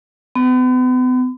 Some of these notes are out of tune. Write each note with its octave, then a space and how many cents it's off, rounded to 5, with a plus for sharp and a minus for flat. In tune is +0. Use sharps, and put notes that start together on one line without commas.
B3 +40